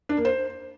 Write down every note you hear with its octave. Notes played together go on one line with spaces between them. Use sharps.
D4
A#3
C5